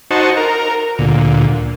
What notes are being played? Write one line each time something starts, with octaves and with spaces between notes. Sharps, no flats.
D#4 F#4 C5 A5 C#6
A#4
D2 A#2